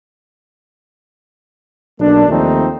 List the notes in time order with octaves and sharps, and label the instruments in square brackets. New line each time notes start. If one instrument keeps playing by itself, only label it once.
[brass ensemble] B1 A#3 D4
D#2 F3 A3 C4 D#4